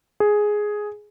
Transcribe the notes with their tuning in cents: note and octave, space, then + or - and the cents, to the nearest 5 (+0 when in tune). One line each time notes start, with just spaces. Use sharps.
G#4 +5